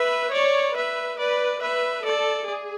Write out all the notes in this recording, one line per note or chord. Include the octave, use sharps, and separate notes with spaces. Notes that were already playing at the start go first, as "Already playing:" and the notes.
Already playing: B4 E5
C#5 D5
B4 E5
B4 D5
B4 E5
A4 D5
G#4